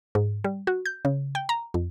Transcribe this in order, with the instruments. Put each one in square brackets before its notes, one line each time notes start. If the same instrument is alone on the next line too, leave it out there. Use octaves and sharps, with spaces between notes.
[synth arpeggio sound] G#2
G3
F#4
G6
C#3
G5
A#5
F2